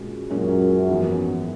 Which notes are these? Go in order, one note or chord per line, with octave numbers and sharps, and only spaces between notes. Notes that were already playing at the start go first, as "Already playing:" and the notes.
Already playing: A#2 G#3 C#4 F#4 A#4
F#2 A#2 G#3 C#4 F#4 A#4
A#1 G#2 E3 B3